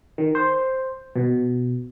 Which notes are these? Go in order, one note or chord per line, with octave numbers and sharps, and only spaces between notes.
D#3
C5
B2